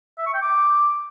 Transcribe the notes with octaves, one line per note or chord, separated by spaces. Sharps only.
E5
C#6
G5
D6